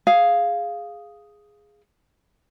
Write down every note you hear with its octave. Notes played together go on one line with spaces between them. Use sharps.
G#4 F5